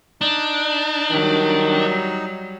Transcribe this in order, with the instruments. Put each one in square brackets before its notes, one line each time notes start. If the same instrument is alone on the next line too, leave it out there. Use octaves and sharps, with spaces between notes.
[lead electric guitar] D4 [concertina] D#4
[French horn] D#3 [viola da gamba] F#3 G3